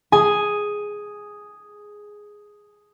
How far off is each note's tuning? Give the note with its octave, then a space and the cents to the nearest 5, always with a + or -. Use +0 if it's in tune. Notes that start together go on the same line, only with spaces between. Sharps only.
G#4 +0 G#5 +0